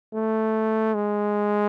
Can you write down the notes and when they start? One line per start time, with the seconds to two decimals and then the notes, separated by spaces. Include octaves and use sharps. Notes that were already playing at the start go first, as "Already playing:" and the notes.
0.14 A3
0.95 G#3